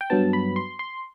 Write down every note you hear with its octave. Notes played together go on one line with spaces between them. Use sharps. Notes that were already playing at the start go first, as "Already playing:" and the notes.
G5
G2 F#3 B3 A5
B5
C6
C6